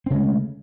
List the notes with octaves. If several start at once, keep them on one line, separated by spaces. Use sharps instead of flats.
C#3 G#3 A3 C4